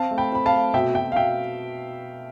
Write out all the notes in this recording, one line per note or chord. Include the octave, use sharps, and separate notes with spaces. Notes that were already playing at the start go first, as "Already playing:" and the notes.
Already playing: C4 F5 A5
A3
G5 B5
C4 B5
F5 A5
A3
B2 E5 G5
B2 E5 G5
F5
B2 E5 G5